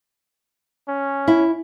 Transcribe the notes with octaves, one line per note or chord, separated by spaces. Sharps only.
C#4
E4